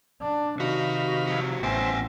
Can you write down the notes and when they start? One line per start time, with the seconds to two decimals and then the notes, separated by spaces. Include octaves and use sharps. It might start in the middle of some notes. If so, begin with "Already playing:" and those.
0.22 D4
0.60 C3 D#3 F#4 F5 B5
1.27 F3 F#4
1.63 A1 B3 C5 E5 G5 G#5